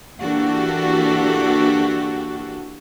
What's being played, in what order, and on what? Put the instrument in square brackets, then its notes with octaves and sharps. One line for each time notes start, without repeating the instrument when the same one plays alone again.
[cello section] E3 A#3 D4 F#4 G4 A4